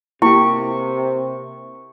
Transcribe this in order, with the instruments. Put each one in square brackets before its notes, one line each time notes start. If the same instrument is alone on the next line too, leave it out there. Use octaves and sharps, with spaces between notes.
[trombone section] C3 [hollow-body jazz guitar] A#3 G4 [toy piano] E4 [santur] C#6